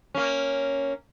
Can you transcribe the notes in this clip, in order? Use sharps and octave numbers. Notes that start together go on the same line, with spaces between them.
A#3 C#4